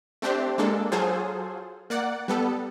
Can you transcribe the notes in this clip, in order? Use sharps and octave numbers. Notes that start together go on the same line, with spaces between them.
A3 C4 D4 G4 C5
G#3 A#3 D4 A4
F#3 F4 G#4 A4 C5
A#3 D5 F#5
G3 B3 A4